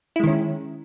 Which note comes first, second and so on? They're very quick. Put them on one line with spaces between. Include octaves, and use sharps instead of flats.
E4 G#3 D#3 C#4